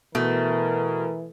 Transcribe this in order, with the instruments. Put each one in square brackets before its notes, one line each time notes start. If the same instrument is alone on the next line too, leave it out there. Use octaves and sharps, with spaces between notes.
[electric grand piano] B2 [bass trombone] E3 [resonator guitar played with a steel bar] A3 [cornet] A#4